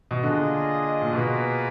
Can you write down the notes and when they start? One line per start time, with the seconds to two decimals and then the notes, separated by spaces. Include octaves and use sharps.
0.11 B2
0.23 D3 A#3 D4 F4 G#4 D#5
1.01 A#2
1.13 B2 A#3 F4 G#4 B4